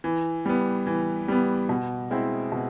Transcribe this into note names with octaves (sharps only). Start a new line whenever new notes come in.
E3
G3 B3
E3
G3 B3
B2
G#3 C4 E4
B2